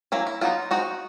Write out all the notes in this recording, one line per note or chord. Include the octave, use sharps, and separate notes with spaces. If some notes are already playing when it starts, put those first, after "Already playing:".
F#3 A#3 C#4 E4
E4
F#3 B3 D#4 F4
G#3 C4 D#4 F#4